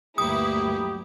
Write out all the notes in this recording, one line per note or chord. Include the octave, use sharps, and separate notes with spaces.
G1 D2 F#3 A#3 E4 G4 B4 D#6